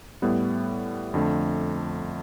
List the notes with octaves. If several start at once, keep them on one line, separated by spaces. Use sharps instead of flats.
A2 G3 B3
F2 D3 A3